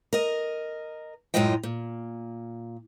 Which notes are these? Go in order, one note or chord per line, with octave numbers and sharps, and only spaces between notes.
A#4 D#5
F#2 A2 G#3 F4 D#5 G5
A#2